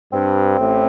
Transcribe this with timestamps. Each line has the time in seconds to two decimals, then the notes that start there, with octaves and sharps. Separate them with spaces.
0.13 G2 C4
0.58 A1 A2